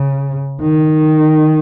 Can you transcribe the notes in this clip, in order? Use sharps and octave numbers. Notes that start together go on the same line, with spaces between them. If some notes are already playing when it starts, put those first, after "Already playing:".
Already playing: C#3
D#3